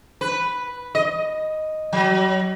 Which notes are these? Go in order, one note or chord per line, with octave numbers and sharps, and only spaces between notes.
B4
D#5
F#3